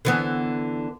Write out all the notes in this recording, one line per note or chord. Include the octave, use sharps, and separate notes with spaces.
D3 E3 B3